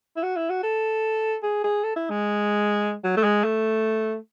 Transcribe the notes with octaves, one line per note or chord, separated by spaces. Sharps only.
E4
F#4
E4
F#4
A4
G#4
G#4
A4
E4
G#3
F#3
A3
G#3
A3